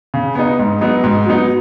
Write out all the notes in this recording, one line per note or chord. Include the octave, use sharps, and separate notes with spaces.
C#3
B3 D#4
G#2
F#3 B3 D#4
G#2
F#3 B3 D#4